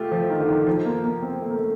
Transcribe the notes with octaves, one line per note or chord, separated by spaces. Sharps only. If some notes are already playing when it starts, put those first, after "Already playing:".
Already playing: A3 F4 G4
F3
D#3
D3
D#3
F3
A#3
A#3
C4
A3
A#3
A3